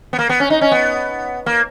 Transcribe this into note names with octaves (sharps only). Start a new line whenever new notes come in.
B3
A#3
B3
C#4
D#4
C#4
B3
A#3